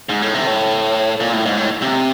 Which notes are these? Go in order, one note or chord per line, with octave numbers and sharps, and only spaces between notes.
G#2
A2
C3
A2
A#2
A2
G#2
A2
C3